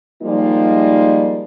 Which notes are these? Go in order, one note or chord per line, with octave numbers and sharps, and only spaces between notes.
F3 G3 G#3 A#3 D#4 F4